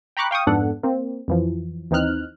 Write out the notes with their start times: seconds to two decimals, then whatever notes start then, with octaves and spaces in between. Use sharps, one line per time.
0.17 G5 A#5 B5 C#6 D6 F#6
0.31 F5 G5 C#6 D#6
0.47 F2 G#2 B3 D4 A4 F#5
0.83 A#3 C4
1.28 F2 E3 F3
1.91 D#2 E3 C4 D#4 F6 F#6